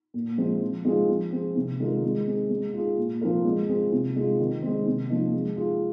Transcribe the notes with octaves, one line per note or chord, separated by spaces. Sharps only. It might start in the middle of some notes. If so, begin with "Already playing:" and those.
A#2
F3 G#3 C4
F3
G#3 C4 F4 G#4
F3
C4 G#4
C3
D#3 G#3 F4 A#4
G#3
C4 G#4
G#3
F4 G#4
A#2
F3 C4 F4 A#4
G#3
C4 F4 G#4
C3
G#3 F4 G#4
D#3
G#3 C4
C3
F3 A#3 D#4
G#3
F4 G#4